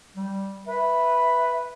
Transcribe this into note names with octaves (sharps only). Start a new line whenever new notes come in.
G3
B4 E5